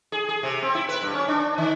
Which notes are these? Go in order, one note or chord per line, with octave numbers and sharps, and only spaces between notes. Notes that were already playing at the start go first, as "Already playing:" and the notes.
G#4
G#4
C3
C4
E4
B4
G2
C#4
D4
D#3